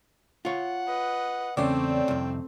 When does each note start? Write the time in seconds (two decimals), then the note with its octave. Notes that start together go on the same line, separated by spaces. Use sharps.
0.45 F4 C#5 F#5
0.87 B4 D#5
1.57 E2 C#3 A3 C4 C#4 C#5 D5 G5
2.08 C2 F2